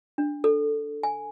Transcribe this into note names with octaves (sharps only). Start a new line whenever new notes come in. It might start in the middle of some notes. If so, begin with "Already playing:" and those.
D4
A4
G#5